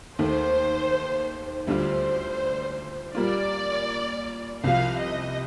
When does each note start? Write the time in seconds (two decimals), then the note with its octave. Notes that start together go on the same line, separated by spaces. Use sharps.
0.18 D#2 D#3 A3 C5
1.67 D2 D3 G3 D4 F4 C5
3.15 A#2 G3 A#3 F4 D5
4.62 C2 C3 F3 F5
5.00 D#5